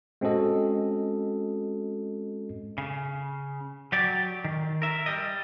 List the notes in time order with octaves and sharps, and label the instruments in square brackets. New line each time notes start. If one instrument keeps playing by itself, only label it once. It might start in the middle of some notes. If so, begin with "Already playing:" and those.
[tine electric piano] G#3 C4 C#4 F#4 A4 D#5
[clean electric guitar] C#3
F#3 G4 D5
D#3
A#4 E5
G3 D#5